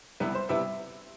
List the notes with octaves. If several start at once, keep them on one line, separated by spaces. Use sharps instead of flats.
C2 C3 G3 B3 E4 B4
C5
C3 G3 B3 E4 E5